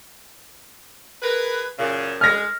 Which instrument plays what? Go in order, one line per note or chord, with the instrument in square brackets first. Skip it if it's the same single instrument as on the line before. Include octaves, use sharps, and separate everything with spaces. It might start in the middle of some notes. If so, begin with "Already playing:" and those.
[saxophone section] G#4 A#4 B4
F#2 A#2 C#3
[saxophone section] G#3 [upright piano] F6 A#6